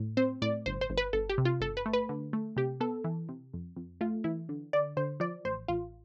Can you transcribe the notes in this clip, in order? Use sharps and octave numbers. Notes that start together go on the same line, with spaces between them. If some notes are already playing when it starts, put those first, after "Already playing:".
Already playing: A2
C4 C5
A2 D5
G1 C5
C5
G1
B4
G1 A4
G4
C3
F4
G1 A4
B4
A3
B4
D3
A3
C3 G4
B3 A4
E3
C3
F2
F2
A3 F4
E3 E4
D3
D3 D5
D3 C5
F3 D5
A1 C5
A1 F4